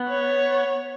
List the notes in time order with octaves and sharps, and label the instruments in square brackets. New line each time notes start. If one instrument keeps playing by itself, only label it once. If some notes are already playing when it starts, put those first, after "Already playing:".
Already playing: [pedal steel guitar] B3
[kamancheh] C#5